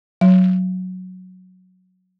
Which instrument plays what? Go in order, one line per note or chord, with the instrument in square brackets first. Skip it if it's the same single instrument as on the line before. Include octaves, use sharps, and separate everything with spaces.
[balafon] F#3